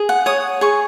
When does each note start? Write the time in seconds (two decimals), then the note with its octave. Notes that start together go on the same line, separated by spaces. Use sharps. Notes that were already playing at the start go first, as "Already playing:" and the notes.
Already playing: G#4
0.09 F#5
0.26 C#5 D#6
0.61 G#4 C#6